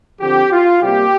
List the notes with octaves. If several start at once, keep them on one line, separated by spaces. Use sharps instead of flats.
D3 F3 C4 G4
F4
C3 G3 A#3 G4